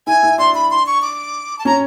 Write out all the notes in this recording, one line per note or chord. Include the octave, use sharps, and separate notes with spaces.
E4 G#5
E4
D4 C6
B5
C6
C#6
D6
A5
C#4 A#5